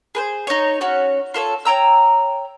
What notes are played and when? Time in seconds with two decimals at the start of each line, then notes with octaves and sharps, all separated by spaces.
0.15 G#4 B4 C5
0.47 D#4 C#5
0.81 C#4 F#4 C#5
1.34 F4 A4 C5 C#5
1.65 C#5 G5 A#5 E6